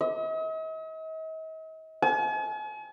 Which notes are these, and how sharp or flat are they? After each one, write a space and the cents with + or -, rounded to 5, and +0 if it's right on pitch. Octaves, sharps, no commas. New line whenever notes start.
D#5 +45
G#5 +45